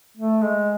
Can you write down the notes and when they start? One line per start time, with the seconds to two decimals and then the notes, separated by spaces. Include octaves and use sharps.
0.17 A3
0.43 G#3